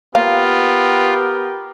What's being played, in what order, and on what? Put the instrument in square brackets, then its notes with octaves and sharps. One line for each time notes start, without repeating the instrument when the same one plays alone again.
[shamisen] A#3 F5 [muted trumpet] B3 [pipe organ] F4 [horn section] G4 A#4